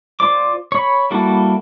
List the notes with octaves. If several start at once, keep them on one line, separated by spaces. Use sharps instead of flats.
F4 C5 D5 D6
C#5 B5
G3 A#3 E4 F#4 A4